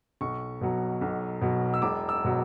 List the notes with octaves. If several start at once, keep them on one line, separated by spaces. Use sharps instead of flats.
B1 C#6
B2 F#3
B1
B2 F#3
E6
E1 D6
E6
B2 F#3